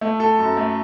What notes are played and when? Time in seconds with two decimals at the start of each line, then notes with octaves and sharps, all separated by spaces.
0.01 A3
0.20 A4
0.39 F#2
0.57 A3